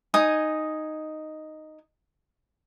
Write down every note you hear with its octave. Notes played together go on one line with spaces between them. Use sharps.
D#4 G#5 D#6